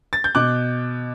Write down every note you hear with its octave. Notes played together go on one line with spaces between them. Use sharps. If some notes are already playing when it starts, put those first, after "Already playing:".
A6
G6
B2 D6 F#6